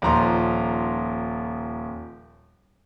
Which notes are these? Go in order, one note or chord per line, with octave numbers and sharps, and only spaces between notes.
D#1 F3 A#5 C6